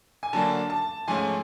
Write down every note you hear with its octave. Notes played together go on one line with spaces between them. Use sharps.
G#5
D3 F#3 A#3 D4 A5
A5
G#2 F3 A3 C#4 G#5